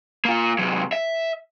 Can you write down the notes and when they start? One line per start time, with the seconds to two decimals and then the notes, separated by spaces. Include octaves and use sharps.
0.25 A#3 F4
0.59 C3 F#3
0.92 E5